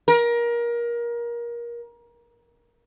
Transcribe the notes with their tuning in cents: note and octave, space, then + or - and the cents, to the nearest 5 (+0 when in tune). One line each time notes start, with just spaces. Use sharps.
A#4 +25